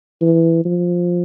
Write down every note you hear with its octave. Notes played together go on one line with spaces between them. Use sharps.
E3
F3